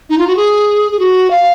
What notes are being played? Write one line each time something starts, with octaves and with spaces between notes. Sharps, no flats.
D#4
F4
F#4
G#4
G#4
F#4
F5